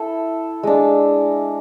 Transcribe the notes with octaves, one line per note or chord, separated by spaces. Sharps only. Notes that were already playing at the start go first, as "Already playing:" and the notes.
Already playing: E4 A4
G#3 D4